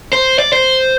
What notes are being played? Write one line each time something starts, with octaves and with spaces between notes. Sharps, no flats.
C5
D5
C5